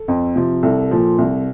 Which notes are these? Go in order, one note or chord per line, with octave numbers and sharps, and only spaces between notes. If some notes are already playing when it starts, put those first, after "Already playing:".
Already playing: A4
F2
C3 F3
C2 A4
A#2 F3
C2